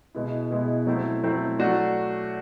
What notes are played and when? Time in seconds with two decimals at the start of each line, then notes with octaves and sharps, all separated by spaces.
0.15 B2 G#3 B3 E4
0.51 B2 G#3 B3 E4
0.87 F#3 A3 C4 E4
1.23 F#3 A3 C4 E4
1.59 F#3 A3 D4 F#4